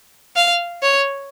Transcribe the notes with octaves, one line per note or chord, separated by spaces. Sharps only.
F5
C#5